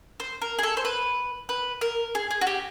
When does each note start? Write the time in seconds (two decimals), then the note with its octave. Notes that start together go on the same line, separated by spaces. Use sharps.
0.20 C5
0.42 A#4
0.59 G#4
0.63 A4
0.77 C5
0.85 B4
1.49 B4
1.81 A#4
2.15 G#4
2.31 G#4
2.41 F#4
2.47 G4